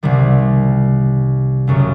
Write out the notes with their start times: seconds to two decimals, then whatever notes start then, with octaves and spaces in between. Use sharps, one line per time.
0.03 C2 C3 D#3 G3
1.67 F#1 F#2 C#3 F#3 A3